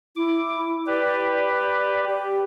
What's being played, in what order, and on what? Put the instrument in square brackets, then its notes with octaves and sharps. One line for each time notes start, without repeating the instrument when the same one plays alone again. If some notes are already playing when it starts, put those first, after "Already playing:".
[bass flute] E4 [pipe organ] D6
[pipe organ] G4 B4 [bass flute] D5
[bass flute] D5
G4